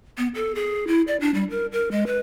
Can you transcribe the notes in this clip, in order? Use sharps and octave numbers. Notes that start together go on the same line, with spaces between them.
B3
A4
G#4
E4
D5
D4
G3
A#4
A#4
G#3
B4